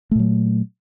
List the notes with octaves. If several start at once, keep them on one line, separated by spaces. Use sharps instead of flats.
A#2 F#3 A3